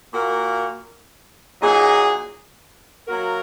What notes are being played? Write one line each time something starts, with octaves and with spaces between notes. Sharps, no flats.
A#2 A#3 F#4 A#4
A#2 F#3 D#4 G#4
F#3 A#3 F#4 A#4